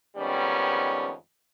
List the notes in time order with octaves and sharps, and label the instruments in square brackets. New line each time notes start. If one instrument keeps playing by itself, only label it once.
[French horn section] F2 G#2 D#3 G3 B3 C#4